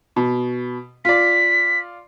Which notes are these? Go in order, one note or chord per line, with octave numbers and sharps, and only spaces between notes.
B2
F4 D5 B6